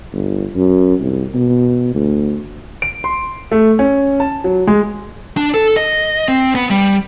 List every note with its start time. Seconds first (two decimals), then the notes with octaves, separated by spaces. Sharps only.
0.13 G1
0.56 F#2
1.00 C2
1.34 B2
1.95 D2
2.82 D7
3.04 C6
3.51 A3
3.79 C#4
4.20 A5
4.44 F#3
4.67 G#3
5.37 D4
5.54 A4
5.77 D#5
6.28 C4
6.55 B3
6.71 G3